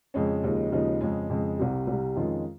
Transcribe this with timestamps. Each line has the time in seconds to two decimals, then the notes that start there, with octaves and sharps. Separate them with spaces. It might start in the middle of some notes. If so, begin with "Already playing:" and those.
0.14 F2 C#3 G#3 C#4
0.44 D#2 C#3 F3 G#3 D#4
0.72 D#2 C#3 F3 G#3 D#4
1.01 F2 C#3 G#3
1.29 F2 C#3 G#3
1.58 C2 C3 G3
1.87 C2 C3 G3
2.16 F2 D#3 G#3 C#4 F4